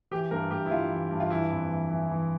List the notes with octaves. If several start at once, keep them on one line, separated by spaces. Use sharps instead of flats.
E3 G4
G2 A#4
G2 G4
E4
G2 F4
E3
G2
F4
E3 E4
F2
E3
E3
E3